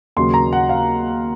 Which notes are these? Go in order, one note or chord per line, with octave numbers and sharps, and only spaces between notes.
D#2 C#3 F#3 A#3 C6
A#5
F#5
F5